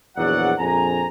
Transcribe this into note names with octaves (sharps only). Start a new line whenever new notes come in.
A#1 E2 F#3 D5 F#5
A#1 F2 G#5 A#5